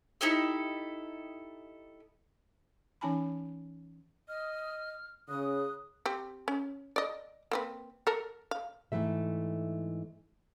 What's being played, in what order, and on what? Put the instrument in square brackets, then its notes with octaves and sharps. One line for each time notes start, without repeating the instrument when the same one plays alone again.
[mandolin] D#4 E4 G4 A4
[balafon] E3 C#4 D#4 G#5 A5 B5
[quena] D#5 [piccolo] F6
[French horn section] C#3 [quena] D#6 [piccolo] F#6
[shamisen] C4 G4
C#4
D5 D#5
A#3 C4 B4
A4 A#4
F5
[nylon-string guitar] G#2 D#3 E3 A3 E5